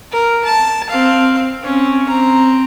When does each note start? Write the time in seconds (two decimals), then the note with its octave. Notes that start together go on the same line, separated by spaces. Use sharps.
0.12 A#4
0.45 A5
0.89 C4 F5
1.63 C4 C#4
2.08 C4 A#5